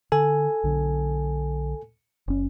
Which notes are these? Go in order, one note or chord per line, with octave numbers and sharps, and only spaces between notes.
D3 A4 G#5
B1 D3
F#1 C#4